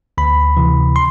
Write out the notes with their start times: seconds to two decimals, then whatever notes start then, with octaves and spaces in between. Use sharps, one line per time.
0.18 D2 B5
0.57 C3 E3
0.96 C6